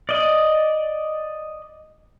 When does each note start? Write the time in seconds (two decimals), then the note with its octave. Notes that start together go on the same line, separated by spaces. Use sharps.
0.09 D5 D#5